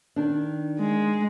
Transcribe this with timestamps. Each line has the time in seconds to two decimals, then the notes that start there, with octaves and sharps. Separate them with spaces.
0.16 D#3 D4
0.79 G#3